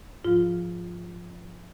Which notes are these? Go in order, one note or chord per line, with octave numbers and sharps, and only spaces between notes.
G#2 F3 F4